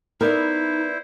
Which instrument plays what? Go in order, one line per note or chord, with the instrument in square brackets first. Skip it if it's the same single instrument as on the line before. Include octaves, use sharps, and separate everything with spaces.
[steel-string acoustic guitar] B3 D5 E5 [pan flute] D#4 [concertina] E4 C5 [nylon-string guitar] A#4